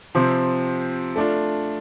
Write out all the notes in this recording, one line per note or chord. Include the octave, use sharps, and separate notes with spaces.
C3 F3 C4
A3 D4 F4